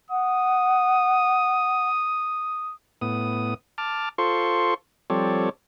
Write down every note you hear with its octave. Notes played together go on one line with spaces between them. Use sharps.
F#5 D#6
A2 B3 D#6
A5 D6 F6
F4 A4 C5 C6 C#6
F3 G3 C4 A4 C#5 D5